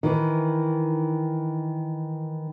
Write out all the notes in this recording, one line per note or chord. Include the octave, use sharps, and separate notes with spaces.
D#3 E3